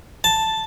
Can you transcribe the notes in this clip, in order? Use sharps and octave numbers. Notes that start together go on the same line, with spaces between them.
A5